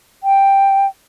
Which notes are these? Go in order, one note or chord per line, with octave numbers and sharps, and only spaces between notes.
G5